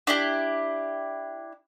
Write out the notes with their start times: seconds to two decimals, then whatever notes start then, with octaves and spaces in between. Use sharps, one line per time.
0.07 D4 E4 G4